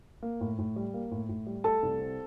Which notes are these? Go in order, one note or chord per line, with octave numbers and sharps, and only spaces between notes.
A#3
A2
A2
G3
A#3
A2
A2
G3
A3 A4 A5
C2
C4